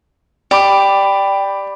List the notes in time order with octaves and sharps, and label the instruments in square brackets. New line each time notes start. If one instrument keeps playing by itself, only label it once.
[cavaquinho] G4 [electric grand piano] D5 B5 D6